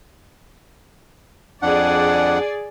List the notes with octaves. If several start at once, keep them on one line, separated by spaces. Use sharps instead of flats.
F2 D4 G#4 D5 F#5